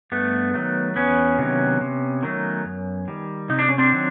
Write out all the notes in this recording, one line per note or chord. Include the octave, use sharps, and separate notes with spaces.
G2 A3 B3
D#3 F#3 A3
E2 B3 C#4
C3 D#3 F#3
C3
D#3 F#3 A3
F#2
D#3 G3
C3 D#4
D4
C#4
C4 D4
D#3 F#3